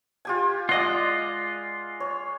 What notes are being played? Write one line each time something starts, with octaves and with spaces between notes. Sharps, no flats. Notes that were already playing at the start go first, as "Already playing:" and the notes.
F4 G4 G#5
G#3 F4 D5 D#5 F#5
C#5